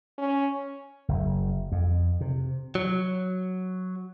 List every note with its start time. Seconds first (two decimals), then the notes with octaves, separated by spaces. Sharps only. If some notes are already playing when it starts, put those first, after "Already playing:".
0.18 C#4
1.08 F#1
1.72 F2
2.21 C3
2.75 F#3